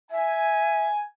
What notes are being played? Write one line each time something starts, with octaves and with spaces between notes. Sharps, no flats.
E5 G#5